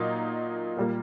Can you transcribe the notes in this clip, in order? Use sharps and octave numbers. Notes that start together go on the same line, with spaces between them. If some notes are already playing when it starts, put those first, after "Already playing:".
Already playing: A#2 F#3 A#3 D#4
A#2 G3 A#3